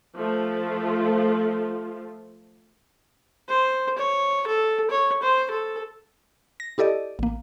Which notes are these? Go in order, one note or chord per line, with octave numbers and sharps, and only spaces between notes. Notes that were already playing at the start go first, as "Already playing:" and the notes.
F3 A3 F4
C5
C#5
A4
C#5
C5
A4
A#6
E4 G4 A4 D5 D#5
A1 A#3